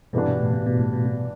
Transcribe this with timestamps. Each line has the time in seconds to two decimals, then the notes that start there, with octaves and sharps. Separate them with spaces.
0.13 G2 B2 E3 G3 B3 D4
0.26 B2
0.40 A2
0.53 B2
0.66 B2
0.79 A2
0.93 B2
1.06 B2